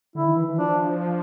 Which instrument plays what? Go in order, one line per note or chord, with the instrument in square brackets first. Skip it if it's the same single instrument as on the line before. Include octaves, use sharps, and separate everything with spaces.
[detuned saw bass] D3 [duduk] E4
[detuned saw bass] D#3
E3
E3
[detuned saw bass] F3 [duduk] D4